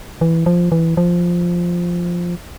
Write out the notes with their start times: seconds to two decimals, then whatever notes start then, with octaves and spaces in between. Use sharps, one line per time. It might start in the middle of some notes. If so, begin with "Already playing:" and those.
0.21 E3
0.46 F3
0.72 E3
0.97 F3